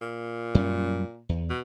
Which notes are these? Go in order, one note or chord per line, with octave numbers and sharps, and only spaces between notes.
A#2
F#2 G3 C#4
E2
B2